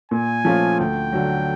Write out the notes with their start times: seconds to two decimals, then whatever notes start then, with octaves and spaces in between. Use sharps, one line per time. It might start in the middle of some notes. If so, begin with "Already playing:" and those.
0.11 A#2 G#5
0.45 F3 A3 C#4 F4
0.79 D2 G5
1.13 D3 F#3